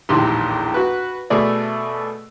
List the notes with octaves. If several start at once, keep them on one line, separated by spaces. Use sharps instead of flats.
A#1 E2 A2 D#3 G4 C6
F#4 B4
B2 A3 G#4 D5